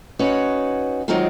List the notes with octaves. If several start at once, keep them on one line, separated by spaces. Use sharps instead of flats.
C#4 D#4 F#4 B4 C#5
D#3 F#3 G#3 C4 D#4 F4